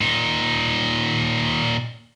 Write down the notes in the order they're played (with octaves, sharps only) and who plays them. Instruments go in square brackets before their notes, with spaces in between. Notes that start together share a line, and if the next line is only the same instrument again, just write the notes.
[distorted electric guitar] A#2 D#4